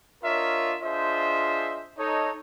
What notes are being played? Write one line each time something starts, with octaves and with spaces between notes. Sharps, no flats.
D4 F4 A#4 C#5 D#5 E5
D4 F4 G#4 C5 D#5 E5
D#4 A4 C#5